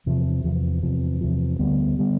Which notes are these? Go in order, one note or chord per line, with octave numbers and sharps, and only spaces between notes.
E2 C3 F3
E2 C3 F3
E2 C3 F3
E2 C3 F3
D2 D3 G3 B3
D3 G3 B3